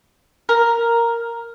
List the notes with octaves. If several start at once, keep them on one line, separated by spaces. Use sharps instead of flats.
A#4